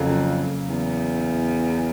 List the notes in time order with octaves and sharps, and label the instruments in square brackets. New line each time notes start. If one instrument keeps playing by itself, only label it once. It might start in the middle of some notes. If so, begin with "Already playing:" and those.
Already playing: [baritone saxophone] F2 [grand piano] C#3 F#3 A#3
[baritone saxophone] E2